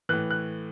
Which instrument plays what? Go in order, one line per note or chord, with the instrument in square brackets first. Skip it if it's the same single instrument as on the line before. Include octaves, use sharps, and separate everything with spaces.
[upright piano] A2 E3 F#6
F#6